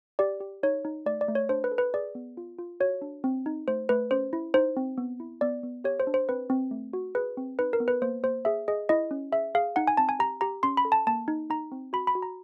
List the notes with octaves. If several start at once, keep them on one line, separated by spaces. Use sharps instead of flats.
G4 D5
G4
D#4 C#5
D#4
A3 D5
D5
A3
C#5
D4 C5
B4
A4
B4
G#4 D5
B3
F4
F4
F#4 C#5
D4
C4
D#4
A3 C5
A3 B4
C#4 C5
E4
D#4 C5
C4
B3
E4
B3 D5
B3
G4 C#5
C5
D4
C5
C4 B4
C4
A3
F#4
G#4 B4
C4
D#4 B4
A#4
B3
B4
A#3 C5
A#3 C5
G#4 E5
G#4 D#5
E4 D#5
C#4
G#4 E5
G#4 F5
D#4 F#5
G#5
C4 A5
G#5
G4 A#5
G4 A#5
C#4 C6
B5
A4
A5
A#3 A5
D#4
D#4 A#5
C4
F#4 B5
B5
F#4
A#5